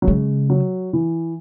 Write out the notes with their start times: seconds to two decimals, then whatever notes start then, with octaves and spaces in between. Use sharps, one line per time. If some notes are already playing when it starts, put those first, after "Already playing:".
0.02 F#3
0.07 C#3 G#3
0.50 F#3
0.93 E3